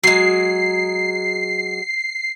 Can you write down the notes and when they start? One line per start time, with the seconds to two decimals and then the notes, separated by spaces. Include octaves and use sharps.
0.03 F#3 G#3 C7